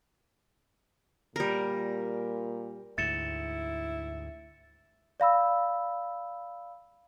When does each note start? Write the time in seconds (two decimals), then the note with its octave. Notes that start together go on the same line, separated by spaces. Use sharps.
1.36 A#2 G3 A#4
2.98 D2 G#2 E4 A6 C#7 E7
5.20 D5 F5 B5 E6